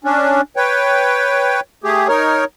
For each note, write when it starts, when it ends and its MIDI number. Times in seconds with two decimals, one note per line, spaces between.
0.04 0.41 61
0.04 0.41 62
0.57 1.60 71
0.57 1.60 73
0.57 1.60 79
1.84 2.08 57
1.84 2.08 67
1.84 2.08 68
2.08 2.44 63
2.08 2.44 70
2.08 2.44 73